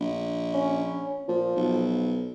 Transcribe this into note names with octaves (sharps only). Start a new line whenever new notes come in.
A#1
C#4
A#2 F3
B1